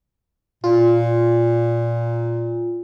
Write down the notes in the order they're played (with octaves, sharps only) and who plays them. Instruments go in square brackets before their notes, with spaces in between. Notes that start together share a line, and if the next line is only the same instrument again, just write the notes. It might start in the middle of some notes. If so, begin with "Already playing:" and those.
[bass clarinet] A#2 [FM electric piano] F4